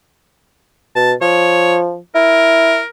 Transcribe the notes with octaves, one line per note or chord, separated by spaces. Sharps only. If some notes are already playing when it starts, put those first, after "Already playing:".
B2 A5
F3 C#5
E4 A#4